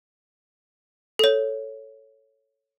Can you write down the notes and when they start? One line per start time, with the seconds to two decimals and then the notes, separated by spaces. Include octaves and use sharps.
1.19 A4 C#5